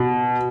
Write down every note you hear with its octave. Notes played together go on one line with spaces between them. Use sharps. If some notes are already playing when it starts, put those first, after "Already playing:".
Already playing: B2